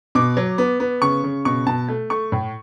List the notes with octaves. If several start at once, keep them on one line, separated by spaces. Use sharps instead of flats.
B2 D6
F#3
B3
B3
C#3 C#6
C#3
B2 C#6
B2 A5
A3
A3 C#6
A2